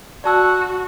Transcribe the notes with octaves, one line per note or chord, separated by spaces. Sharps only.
F#4 D5 A5 E6